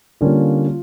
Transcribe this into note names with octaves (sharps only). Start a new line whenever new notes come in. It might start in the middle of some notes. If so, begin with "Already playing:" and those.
D3 G3 A#3 C#4 F4
F4